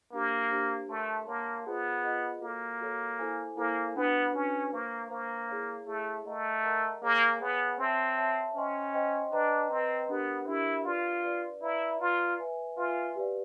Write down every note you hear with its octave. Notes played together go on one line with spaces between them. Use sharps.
A#3 D4 G4 C5
D4 G4 C5
A3 A#4 C#5 F#5 A5 C6
A#3 A#4 C#5 F#5 A5 C6
B3 F4 G#4 C5 D#5 F#5
F4 G#4 C5 D#5 F#5
A#3 F#4 A4 C#5
F#4 A4 C#5
E4 A4 C5 F5 G#5
A#3 E4 A4 C5 F5 G#5
B3 D4 F#4 B4
C#4 D4 F#4 B4
A#3 C5 F5 A#5 C#6
A#3 C5 F5 A#5 C#6
E4 G#4 C#5 F5
A3 E4 G#4 C#5 F5
A3 A#4 D#5 F#5 A#5
A#4 D#5 F#5 A#5
A#3 G#4 C#5 F5 G#5 C#6
B3 G#4 C#5 F5 G#5 C#6
C4 C#5 E5 A5
C#5 E5 A5
C#4 C5 D#5 G5 C6
C5 D#5 G5 C6
D4 B4 D#5 G5 A#5
C4 B4 D#5 G5 A#5
B3 D4 G4 A#4
D4 E4 G4 A#4
F4 B4 D5 F5
B4 D5 F5
E4 B4 D5 F5 A#5
F4 B4 D5 F5 A#5
B4 E5 G#5
F4 B4 E5 G#5
G4 B4 D5 F5